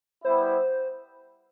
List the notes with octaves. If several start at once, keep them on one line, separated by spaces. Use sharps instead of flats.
G3 B3 E4 C5